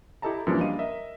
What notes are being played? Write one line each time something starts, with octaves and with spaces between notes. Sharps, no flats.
E4 G4 A4 D#5 A5 A#5
F#2 E3 F3 G3 A#3 D4
G3 D4 D#5 F5 D#7
A#4 D#5 E5